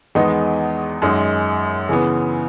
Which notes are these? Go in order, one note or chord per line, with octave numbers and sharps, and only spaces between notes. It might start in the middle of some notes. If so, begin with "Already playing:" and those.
E2 D#3 G#3 B3 D#4
F#2 D#3 G#3 D#4
C#3 E3 B3